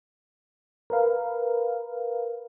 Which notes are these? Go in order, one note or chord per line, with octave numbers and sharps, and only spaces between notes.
A#4 B4 F5